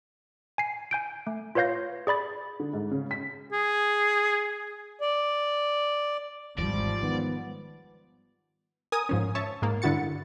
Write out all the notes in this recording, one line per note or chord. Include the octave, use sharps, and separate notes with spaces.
G#5 C7
G#5 G6 D7
A3
F4 B4 C#5 F5 G6 A#6
G#4 D5 B5 A6
D3
G#2
C#3
B6
G#4
D5
G#1 E2 G#2 F3 G3 D5
D#3 B3
A#4 G#5 D#6
G#2 F3 C#4
C#5 E5 A5 C#6
G#2 A#3
G2 D3 E4 F#4 A6 C#7